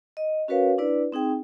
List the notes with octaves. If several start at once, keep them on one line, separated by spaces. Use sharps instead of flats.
D#5
C#4 F#4 A#4 B4 C#5 F5
D4 E4 B4 D5
C4 D#4 G#4 G5